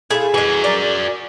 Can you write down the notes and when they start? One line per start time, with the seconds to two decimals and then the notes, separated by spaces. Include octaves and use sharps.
0.11 A3 E4 F4 G#4
0.34 E3 G#3 F#4 G#5
0.64 A#4 D5